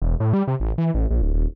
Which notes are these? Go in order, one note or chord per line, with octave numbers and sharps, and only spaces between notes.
E1
A2
G3
C3
A1
E3
A1
A#1
D1
D#1